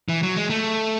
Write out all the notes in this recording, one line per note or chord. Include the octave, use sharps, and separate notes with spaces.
E3
F#3
G#3
A3